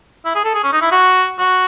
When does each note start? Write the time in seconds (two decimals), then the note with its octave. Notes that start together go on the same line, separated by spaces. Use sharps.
0.25 E4
0.35 G#4
0.44 A4
0.54 G#4
0.63 C#4
0.72 D#4
0.82 E4
0.91 F#4
1.39 F#4